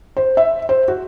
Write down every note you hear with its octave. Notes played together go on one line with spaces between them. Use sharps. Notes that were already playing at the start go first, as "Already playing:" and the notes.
C5
E5
C5
F#4